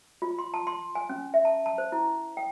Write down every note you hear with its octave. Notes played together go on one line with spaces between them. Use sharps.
F4
C6
A5
C6
G#5
C#4
E5
A5
A5
C5
E4
G5